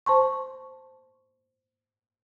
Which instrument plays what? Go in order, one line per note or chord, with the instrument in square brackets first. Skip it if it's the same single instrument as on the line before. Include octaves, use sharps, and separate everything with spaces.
[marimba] C5 A5 C6 C#6